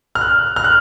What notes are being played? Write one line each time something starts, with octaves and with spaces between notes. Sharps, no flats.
F6
F#6
F6
F#6